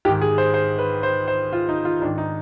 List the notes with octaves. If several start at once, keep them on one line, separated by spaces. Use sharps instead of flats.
G#2 D#3 G4
G#4
C5
C5
B4
C5
C5
F4
D#4
F4
G#2 D#3 D4
D#4